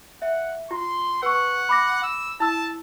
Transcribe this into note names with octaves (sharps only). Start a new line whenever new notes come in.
E5 F#5
F4 C6
B4 F#5 C#6
B5 D6 A#6
E6
E4 A5 E6